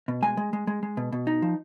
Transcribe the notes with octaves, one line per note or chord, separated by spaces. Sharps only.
B2
G#3 G#5
G#3
G#3
G#3
G#3
B2
B2
D#4
F3